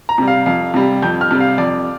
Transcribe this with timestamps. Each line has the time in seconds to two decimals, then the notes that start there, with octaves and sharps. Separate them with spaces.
0.09 A#5
0.18 C3 G3
0.27 F5
0.46 F2 F5
0.74 C3 G3
1.02 F2 G6
1.21 F6
1.31 C3 G3
1.40 F5
1.58 F2 D5